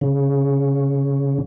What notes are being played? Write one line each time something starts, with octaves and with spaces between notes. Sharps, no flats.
C#3